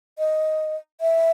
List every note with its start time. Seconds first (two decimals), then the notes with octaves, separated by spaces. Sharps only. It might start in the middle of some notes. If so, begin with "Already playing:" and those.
0.19 D#5
1.01 E5